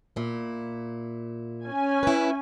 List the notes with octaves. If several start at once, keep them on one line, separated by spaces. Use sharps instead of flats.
A#2 E4
C#4 G#5
E4 B4